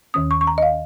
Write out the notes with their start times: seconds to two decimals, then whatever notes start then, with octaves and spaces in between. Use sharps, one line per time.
0.14 D#2 D#3 C#4 D#6
0.31 C#6
0.41 C#6
0.47 A#5
0.58 D#5
0.62 F5